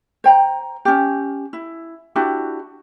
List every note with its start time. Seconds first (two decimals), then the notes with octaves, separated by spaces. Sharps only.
0.24 C5 G5 A#5
0.85 C#4 G4
1.53 E4
2.16 D4 E4 F#4 G4